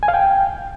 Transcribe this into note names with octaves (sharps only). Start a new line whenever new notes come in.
G#5
F5
G5